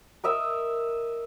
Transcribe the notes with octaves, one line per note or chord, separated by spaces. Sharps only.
A#4 D#5 E5 E6